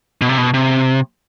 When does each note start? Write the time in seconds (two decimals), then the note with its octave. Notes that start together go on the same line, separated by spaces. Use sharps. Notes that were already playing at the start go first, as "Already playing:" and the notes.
0.22 B2
0.29 C3
0.38 B2
0.54 C3